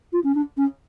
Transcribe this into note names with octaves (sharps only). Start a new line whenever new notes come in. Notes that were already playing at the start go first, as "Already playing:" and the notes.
F4
C#4
D4
C#4